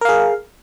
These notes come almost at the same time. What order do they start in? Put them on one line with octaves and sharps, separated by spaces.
A#4 F5 G#4